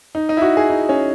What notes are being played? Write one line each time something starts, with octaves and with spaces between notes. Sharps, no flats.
D#4
D#4
E4
F#4
G#4
D#4
C#4